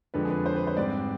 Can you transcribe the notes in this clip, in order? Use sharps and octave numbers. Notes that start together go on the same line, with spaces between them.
F2 D3 G#3 D4 B4
G#4
B4
C5
B4
C5
G#2 G3 C4 D5